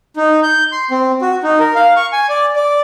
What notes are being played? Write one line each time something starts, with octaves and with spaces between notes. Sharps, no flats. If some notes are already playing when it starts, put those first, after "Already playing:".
D#4
G6
C6
C4
F#4
D#4
A#4
F5
C#6
G#5
D5
D5